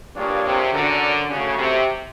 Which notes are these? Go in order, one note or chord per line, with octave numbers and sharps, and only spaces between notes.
G2 A#3 D4 F4 G#4 C#5
C3
D3 C#4 F#4 A#4 D5
C#3 A3 C#4 F#4
C3